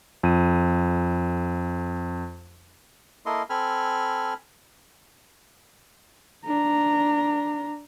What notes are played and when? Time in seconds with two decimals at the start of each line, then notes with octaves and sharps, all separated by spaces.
0.23 F2 D#7
3.26 A#3 E4 A4 A#4 D#5 C6
3.50 C4 A4 G#5 B5 F6
6.45 D4 A#5